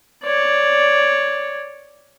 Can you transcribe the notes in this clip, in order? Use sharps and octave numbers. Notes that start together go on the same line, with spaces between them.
C#5 D5